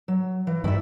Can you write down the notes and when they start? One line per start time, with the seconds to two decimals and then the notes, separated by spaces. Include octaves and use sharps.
0.08 F#3
0.47 E3
0.64 G2 D#3 E4 D5 E5